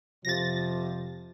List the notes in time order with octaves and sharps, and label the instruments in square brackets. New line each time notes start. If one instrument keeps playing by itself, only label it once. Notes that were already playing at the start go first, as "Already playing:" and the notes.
[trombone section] F2 F3 [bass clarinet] C3 [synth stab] A6 A#6